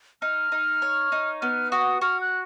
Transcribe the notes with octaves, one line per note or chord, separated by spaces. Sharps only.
D#4 F6
D#4
C#5
D#4
B3 F6
F#4 D#6
F#4 F6
F#6